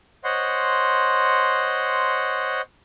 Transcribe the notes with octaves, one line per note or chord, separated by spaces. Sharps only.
C5 C#5 D#5 F#5 C6